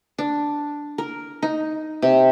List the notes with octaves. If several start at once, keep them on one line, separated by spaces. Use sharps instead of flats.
D4
A#4
D#4
C3